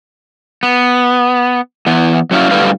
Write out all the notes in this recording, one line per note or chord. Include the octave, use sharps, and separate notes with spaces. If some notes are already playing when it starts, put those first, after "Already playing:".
B3
E3 B3
F#3 C#4 E4 F5
F#2 A2 D3 G3 B4 F5